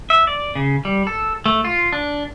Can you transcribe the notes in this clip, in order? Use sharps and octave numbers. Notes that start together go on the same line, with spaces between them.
E5
D5
C#3
G3
A4
A3
F4
D4